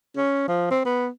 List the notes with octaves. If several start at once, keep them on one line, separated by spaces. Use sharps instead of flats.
C#4
F3
C4
B3